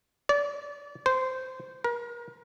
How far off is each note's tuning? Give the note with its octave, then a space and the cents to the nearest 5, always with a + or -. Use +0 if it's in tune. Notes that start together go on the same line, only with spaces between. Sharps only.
D5 -30
C5 -15
A#4 +35